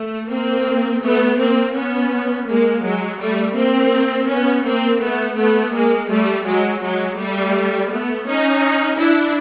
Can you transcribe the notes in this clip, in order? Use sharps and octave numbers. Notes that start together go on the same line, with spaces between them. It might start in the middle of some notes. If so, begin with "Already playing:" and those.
Already playing: A3
A#3 C4
A3 B3
A#3 C4
B3 C#4
G#3 A#3
F#3 G#3
G3 A3
A#3 C4
B3 C#4
A#3 C4
A3 B3
A3 B3
G#3 A#3
G3 A3
F#3 G#3
F#3 G#3
G3 A3
A3 B3
C#4 D#4
D4 E4